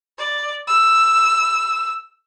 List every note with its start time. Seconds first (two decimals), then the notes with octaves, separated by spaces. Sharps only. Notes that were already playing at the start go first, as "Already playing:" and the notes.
0.18 D5
0.67 E6